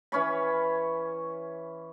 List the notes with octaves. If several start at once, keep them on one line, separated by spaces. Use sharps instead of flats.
E3 C#4 C#5 B5